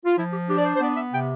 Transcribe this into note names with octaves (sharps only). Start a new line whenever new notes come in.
F4
F3 E4
G4
D4 G4
D5
C5
C5
B3 D5
E5
C3 G5